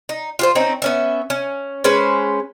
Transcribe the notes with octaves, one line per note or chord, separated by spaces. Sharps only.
D#4
F4 F#4 C5
C4 C#4 D#4
B3 C#4 E5
C#4
G#3 C#4 B4 C5